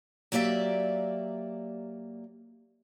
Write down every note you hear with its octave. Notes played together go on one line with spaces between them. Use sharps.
F#3 A#3 G4 D5 E5